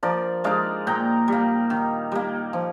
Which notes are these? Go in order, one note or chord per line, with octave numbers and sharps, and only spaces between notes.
F3 A#4 D5
G#3 D#4 D5 F5
A#2 G5 A#5
G3 A#3
D#3
G3 A#3
F3